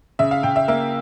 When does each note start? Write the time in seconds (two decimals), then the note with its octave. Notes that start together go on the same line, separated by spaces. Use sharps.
0.19 C#3 E5
0.31 F5
0.43 C#3 G5
0.56 E5
0.68 A#3 E5